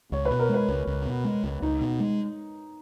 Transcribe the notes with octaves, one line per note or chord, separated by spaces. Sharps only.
C#2 C#5
B4
B2
A#4
G#3
B4
C#2
C#2
B2
G#3
C#2
C#2 D#4
B2
G#3